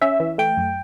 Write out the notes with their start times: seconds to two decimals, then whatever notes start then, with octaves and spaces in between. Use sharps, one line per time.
0.02 C#4 E5
0.20 E3
0.38 A3 G5
0.57 F#2